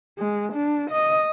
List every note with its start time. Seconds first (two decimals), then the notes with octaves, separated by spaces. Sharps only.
0.18 G#3
0.53 D4
0.91 D#5